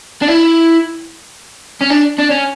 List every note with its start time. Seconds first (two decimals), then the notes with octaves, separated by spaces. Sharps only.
0.22 D4
0.28 E4
1.81 C#4
1.90 D4
2.18 D4
2.30 C#4